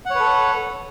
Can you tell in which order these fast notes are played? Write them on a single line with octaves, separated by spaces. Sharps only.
F#5 C#5 B4 A4